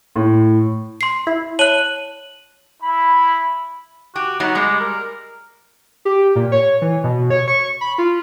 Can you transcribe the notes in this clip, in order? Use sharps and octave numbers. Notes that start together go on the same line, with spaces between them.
A2
C6 C7
E4
C#5 A5 F#6 D#7 F#7
E4 B5
F#4 G4
F#3 B3 D#4
G3 G#3
A#4
G4
A#2
C#5
E3
B2
C#5
C#6
B5
F4